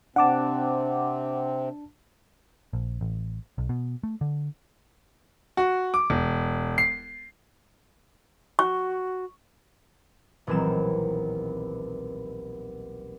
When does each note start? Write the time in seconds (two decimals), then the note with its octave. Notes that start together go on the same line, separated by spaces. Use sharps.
0.16 C3 C4 D4 F#5 A5 D6
2.73 A#1
3.01 A1
3.58 B1
3.69 B2
4.03 A3
4.21 D3
5.57 F#4
5.94 D6
6.10 E1
6.78 C7
8.59 F#4 C#6
10.47 D#1 B1 E3 C4 E7